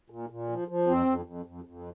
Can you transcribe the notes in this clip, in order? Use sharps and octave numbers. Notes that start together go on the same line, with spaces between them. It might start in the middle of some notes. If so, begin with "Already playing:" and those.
A#2
A#2
F3
F3
F2 C4
F2
F2
F2
F2